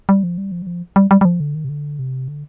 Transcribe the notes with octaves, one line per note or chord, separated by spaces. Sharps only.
G3
F3
G3
F3
G3
F3
G3
G3
G3
F3
D3
D#3
C3
D3
C3
D3